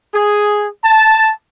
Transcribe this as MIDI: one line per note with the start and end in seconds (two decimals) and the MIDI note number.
0.14 0.67 68
0.84 1.32 81